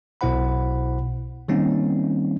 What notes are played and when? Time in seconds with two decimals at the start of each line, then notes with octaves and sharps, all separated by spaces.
0.21 B1 B2 E4 C5 F#5 B5
1.48 D#3 G3 A#3 C4 C#4 D#4